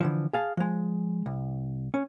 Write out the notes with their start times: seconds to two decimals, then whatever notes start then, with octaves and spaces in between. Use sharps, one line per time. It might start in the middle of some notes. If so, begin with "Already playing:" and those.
0.01 D3 E3 F3
0.33 G#4 F5 A5
0.57 F3 G#3
1.26 C2
1.94 C#4